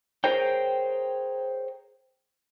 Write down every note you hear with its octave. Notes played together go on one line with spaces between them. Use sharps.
G#4 A#4 C5 C#5 G5